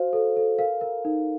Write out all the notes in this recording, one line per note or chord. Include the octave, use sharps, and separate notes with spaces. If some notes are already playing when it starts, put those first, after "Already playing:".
Already playing: F#4 C5 F5
A4
A4
A#4 F5
A#4
D#4